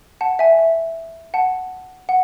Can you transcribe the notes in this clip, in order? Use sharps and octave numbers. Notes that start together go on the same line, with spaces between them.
F#5 A5
E5 G#5
E5
F#5 A5
F#5